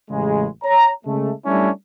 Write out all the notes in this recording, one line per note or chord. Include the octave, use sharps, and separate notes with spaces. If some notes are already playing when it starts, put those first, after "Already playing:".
A1 C#3 G#3
C#5 A#5
C#3 G#3 A3
G3 A3 C#4 D4 E4